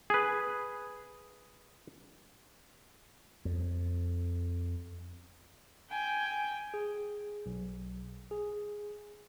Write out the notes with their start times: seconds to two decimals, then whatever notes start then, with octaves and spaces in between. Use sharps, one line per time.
0.10 G#4 B4
3.45 F2
5.90 G5 G#5
6.74 G#4
7.46 B1
8.31 G#4